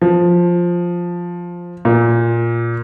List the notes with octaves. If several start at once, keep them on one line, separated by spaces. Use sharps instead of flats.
F3
A#2